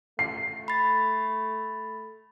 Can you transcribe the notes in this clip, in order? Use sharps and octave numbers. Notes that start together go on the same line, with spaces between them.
A3 C7
B5 A6